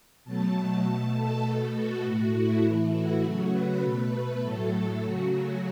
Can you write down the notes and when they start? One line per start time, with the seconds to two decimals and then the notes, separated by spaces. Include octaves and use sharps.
0.25 B2 F#3 A3 A5
0.84 B2 A3 A5
1.14 A4
1.44 B2 A3
1.74 F#4
2.03 A2 A3
2.32 E4
2.63 A2 E3 A3
2.93 F#4
3.22 C#3 F#3 A3
3.51 B4
3.81 B2 A3
4.11 B4
4.41 A2 F#3 A3 A4
5.01 C#3 F#3 A3 F#4